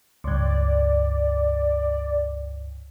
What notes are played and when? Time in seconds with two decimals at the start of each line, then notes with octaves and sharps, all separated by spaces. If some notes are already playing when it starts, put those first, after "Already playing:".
0.24 C#2 G2 D5